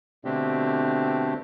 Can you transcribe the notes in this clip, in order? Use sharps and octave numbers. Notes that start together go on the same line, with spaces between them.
B2 D3 A3 C4 D4 G4